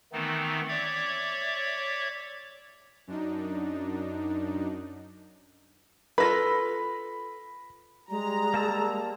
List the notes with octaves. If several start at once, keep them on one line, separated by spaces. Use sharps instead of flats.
D#3 E3 A3 B3 C4 D#4
C#5 D5 E5 D6 G#6
F#2 D4 D#4
F4 A4 B4 B5 A#6
G3 G#3 A#5
A#3 A5 E6